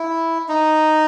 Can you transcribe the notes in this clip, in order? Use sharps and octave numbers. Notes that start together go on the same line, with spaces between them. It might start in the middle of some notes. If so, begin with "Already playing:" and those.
Already playing: E4
D#4